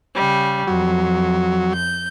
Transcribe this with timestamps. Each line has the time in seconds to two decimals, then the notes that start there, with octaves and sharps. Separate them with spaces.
0.15 C#3 G3
0.67 F2 F#3
1.74 G6